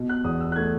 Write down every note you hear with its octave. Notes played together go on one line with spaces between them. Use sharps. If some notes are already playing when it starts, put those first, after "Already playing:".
Already playing: B2
F#6
E2 D#6
E6
F#6
A3 G#6